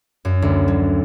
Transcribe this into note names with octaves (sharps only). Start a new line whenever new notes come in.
F#2
D2
F#3